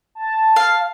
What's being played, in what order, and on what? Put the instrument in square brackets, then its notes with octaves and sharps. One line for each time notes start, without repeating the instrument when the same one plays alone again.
[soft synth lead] A5
[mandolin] F5